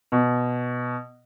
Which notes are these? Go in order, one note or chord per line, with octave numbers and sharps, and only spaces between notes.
B2